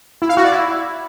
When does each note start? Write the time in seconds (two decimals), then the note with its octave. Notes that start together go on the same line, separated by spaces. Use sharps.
0.22 E4
0.29 F5
0.37 F#4
0.45 D5
0.52 E4